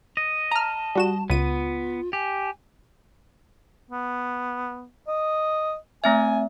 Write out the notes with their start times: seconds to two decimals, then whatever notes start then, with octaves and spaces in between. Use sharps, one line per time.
0.17 D#5
0.51 A5 A#5 F6
0.95 G3 F#4 E7
1.30 C#2 B3 F4 D#7
2.13 G4 G#5
3.91 B3
5.08 D#5
6.04 A3 C4 E5 G#5